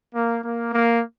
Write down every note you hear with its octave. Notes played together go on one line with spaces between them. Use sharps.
A#3
A#3
A#3